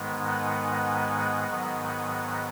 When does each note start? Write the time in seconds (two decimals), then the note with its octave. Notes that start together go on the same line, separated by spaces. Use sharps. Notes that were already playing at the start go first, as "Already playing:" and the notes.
Already playing: G#2 D#3 G#3 B3
0.24 D#5 F#5
1.48 G#2 D#3 F#3 B3